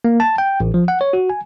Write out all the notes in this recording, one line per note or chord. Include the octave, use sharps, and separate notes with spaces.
A#3
A5
G5
A1
F3
F#5
C#5
F#4
G#5